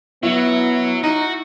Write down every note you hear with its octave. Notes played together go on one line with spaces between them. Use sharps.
F#3 B3 E4 F#4
D#4 F#4